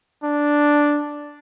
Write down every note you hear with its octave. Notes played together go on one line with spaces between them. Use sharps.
D4